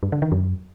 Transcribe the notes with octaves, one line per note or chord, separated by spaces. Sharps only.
G2
D3
D#3
F#2